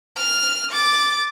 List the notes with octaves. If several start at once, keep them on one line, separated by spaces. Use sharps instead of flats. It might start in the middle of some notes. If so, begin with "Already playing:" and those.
F6
D6 A6